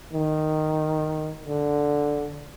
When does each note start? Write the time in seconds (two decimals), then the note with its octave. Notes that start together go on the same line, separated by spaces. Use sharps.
0.13 D#3
1.45 D3